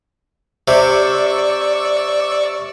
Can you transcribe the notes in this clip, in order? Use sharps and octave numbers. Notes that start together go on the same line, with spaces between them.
C3 D5 C#6 E6